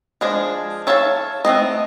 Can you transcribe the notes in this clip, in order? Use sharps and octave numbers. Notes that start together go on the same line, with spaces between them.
F3 G#3 D4
A4 C#5 E5 F5 A5
A3 B3 C4 D#5